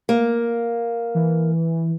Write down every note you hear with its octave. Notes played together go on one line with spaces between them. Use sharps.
A#3
E3